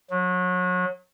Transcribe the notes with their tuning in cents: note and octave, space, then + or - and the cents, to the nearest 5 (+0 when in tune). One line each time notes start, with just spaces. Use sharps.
F#3 -30